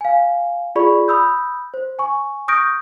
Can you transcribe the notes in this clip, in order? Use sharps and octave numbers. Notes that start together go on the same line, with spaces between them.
F5 G#5
F4 G#4 D5 B5 C#6
B5 D#6 E6 G6
C5
G#5 C#6
C#6 D#6 F6 G6 A#6 D7